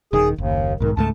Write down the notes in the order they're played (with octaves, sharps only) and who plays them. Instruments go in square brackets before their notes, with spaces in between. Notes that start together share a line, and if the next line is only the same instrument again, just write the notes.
[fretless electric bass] D#1 D#3 [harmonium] G#4
[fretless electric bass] F#1 [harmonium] D#2
[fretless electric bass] B1 G#2 [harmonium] D#3
[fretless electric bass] C#2 G#2 A3 [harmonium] A5